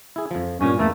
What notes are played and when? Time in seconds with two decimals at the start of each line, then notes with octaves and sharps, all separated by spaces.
0.16 E4 G#4
0.31 F2 F3
0.61 G2 A#2 C#4
0.79 E2 A3 A#3